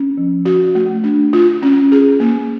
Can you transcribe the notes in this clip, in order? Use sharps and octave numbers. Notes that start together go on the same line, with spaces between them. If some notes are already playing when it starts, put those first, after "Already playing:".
Already playing: C#4
F3
F#4
A3
D4
F4
C#4
G#4
A#3